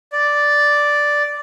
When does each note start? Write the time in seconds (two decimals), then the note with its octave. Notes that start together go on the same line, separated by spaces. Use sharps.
0.12 D5